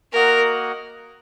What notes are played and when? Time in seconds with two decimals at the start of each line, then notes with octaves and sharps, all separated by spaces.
0.14 A#3 F#4 A#4 D#5 F#5